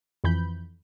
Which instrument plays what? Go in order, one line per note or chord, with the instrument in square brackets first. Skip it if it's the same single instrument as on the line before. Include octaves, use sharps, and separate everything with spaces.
[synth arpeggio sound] F2 E3 B5 G6